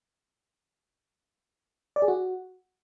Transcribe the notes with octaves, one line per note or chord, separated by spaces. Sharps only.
D5
G#4
F#4